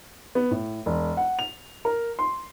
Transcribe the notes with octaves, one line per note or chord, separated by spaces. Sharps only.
B3
A2
E1
F#5
F7
A#4
C6